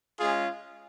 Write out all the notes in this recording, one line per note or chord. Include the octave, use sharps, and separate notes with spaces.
G#3 C#4 F4 G#4